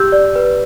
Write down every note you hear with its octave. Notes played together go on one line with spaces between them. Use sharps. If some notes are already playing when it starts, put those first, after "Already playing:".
Already playing: G4 E6 G6
D5
B4